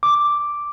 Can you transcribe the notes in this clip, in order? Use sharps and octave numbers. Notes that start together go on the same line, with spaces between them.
D6